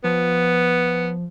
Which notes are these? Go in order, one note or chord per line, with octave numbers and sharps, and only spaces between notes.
F3 B3